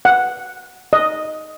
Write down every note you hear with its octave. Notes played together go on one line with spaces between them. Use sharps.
F#5
D#5